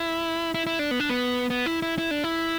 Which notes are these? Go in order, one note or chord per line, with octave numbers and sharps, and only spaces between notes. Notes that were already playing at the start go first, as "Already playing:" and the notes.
Already playing: E4
E4
E4
D4
B3
D4
B3
B3
E4
E4
E4
D4
E4